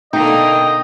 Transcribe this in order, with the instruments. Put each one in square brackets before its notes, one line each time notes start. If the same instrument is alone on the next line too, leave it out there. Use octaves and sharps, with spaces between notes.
[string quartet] B2 D3 A#3 [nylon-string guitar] D#4 [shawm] D#5 [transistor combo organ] G5